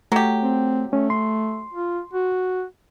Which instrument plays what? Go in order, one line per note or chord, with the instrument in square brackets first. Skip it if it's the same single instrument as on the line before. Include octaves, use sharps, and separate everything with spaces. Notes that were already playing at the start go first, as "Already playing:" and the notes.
[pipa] F#3 G4 [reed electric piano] A3
[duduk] C4
[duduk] A3 [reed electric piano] C#4
[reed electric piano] C6
[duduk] F4
F#4